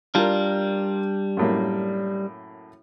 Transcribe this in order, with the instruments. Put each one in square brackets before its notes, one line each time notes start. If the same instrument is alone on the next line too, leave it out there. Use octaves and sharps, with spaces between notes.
[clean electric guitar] G3 D4 [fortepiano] F4 A#4
[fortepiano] F#2 A2 A#3